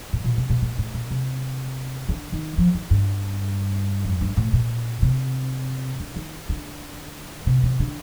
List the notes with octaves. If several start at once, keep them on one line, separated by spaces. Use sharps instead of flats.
A2
A#2
C3
A#2
A#2
A2
A#2
C3
D3
D#3
F3
D#3
G2
F2
G2
A2
A#2
C3
D3
D#3
D3
C3
C3
D3